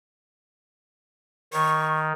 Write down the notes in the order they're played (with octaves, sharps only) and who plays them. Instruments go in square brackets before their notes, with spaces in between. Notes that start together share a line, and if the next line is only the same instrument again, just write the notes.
[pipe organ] D#3 [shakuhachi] C#6